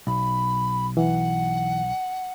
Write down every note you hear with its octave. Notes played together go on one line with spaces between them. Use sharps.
B1 B5
E3 F#5